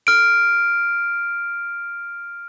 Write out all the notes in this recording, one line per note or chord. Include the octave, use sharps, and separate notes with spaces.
F6 D7